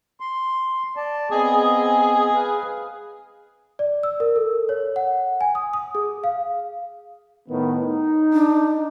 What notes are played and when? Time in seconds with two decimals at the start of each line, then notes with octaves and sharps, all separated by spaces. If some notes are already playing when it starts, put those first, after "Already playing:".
0.20 C6
0.97 D5 A5
1.32 B3 C4 G#4 D#5
2.35 B4 F5
3.79 D5
4.03 E6
4.20 A#4
4.36 A4
4.69 C#5
4.96 F#5
5.41 G#5
5.55 D#6
5.73 D#6
5.95 G#4
6.24 F5
7.48 A2 D#3 B3
7.81 D#4
8.33 D4